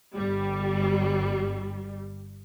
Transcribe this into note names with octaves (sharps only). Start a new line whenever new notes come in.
G1 G3